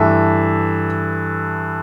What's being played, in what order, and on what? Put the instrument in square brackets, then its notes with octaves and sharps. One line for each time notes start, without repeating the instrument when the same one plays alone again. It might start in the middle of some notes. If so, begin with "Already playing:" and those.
Already playing: [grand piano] G2 E3 A3 E5